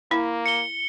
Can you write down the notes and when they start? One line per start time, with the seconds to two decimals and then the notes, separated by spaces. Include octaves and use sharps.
0.11 A#3 E4
0.46 C#7 G7